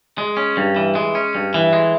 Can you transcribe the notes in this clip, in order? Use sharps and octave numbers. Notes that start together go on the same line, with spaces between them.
G#3
C#4
G2
E3
G#3
C#4
G2
E3
G#3